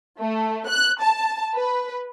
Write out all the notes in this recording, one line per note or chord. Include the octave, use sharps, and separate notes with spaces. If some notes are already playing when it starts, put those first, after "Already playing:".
A3
F#6
A5
B4